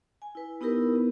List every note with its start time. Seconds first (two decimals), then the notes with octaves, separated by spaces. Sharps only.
0.22 G#5
0.35 E4 B4
0.61 B3 D#4 E4 G4 A#4 B4
0.95 B3